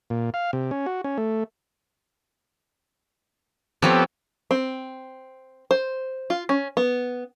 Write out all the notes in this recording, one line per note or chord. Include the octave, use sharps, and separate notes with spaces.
A#2
F5
C3
C#4
F#4
C#4
A3
F3 B3 C4 G4 A4 C#5
C4
C5
F4
C#4
B3